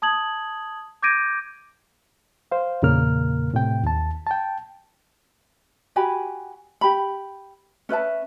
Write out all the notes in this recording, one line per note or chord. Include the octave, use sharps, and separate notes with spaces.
A5 D#6 G#6 F#7
D6 G6 G#6 A#6 D7 D#7
C5 F5
E2 A#2 C#3 A#3 A#4 F6
A2 C3 G5
D#2 A5
G5 A5
F#4 G4 G#5 B5
G4 B5
C#4 B4 E5 A5